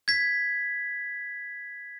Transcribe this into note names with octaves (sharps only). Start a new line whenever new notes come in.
G#6 B6